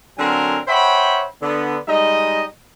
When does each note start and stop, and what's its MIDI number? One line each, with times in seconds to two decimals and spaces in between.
0.18 0.59 50
0.18 0.59 54
0.18 0.59 60
0.18 0.59 69
0.18 0.59 70
0.18 0.59 80
0.68 1.23 72
0.68 1.23 73
0.68 1.23 76
0.68 1.23 78
0.68 1.23 79
0.68 1.23 83
1.41 1.78 50
1.41 1.78 59
1.88 2.43 55
1.88 2.43 56
1.88 2.43 63
1.88 2.43 75